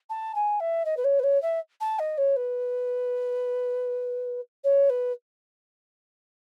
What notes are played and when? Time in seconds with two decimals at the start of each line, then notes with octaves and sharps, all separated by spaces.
0.09 A5
0.35 G#5
0.60 E5
0.85 D#5
0.97 B4
1.04 C#5
1.19 B4
1.23 C#5
1.42 E5
1.80 A5
1.99 D#5
2.17 C#5
2.36 B4
4.64 C#5
4.89 B4